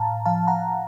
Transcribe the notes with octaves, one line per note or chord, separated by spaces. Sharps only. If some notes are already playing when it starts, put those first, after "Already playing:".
Already playing: A2 F5 A5 A#5
F3 F5 A5
F#5 A#5